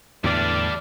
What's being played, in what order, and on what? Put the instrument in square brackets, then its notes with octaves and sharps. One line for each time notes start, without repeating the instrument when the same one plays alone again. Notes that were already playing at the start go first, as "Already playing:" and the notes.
[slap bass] E2 A2 D3 [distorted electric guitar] G3 D4 [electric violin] D5 F6